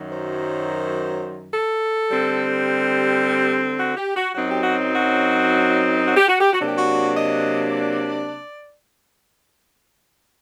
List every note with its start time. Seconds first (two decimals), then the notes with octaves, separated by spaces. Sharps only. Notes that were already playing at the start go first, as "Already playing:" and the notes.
Already playing: F#2 D#3 F#3
0.12 C5
1.53 A4
2.10 D3 G3 C4
2.66 G4
3.79 F#4
3.97 G4
4.17 F#4
4.35 F#2 F#3 C4 D#4 F#4
4.49 G4
4.63 F#4
4.92 F#4
6.04 F#4
6.17 G4
6.29 F#4
6.41 G4
6.53 F#4
6.61 C3 F#3 A#3 D4 G4
6.78 F#4
7.16 D#5
7.73 D5